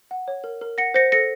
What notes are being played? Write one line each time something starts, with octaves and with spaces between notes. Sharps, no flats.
F#5
C#5
A#4
A#4
F#5 A#6 C#7
C5 A#6 C#7
A4 A#6 C#7